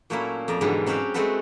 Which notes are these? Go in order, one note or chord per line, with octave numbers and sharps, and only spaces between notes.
A#2 F#3 A3 A#3 C#4 E4
F2 D5 A#5
G#2 B2 D3 E3 F#3 G3
F#3 C4 C#4 F#4 G4 F5
G#3 A3 C4 F#4 A4 B4